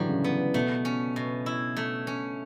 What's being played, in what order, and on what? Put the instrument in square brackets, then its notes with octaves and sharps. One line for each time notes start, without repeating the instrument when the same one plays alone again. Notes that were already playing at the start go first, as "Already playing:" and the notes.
Already playing: [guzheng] A2 G3 [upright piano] D3 E3 F#3
[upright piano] C#3
[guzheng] B3
[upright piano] B2 [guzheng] A3
[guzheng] C#4
B2
E4
A3
C#4